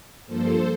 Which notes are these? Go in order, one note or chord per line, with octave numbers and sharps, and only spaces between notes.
G2 F3 A#3 A4 C5